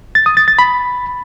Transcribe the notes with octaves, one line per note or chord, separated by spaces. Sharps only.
A6
D#6
A6
A6
B5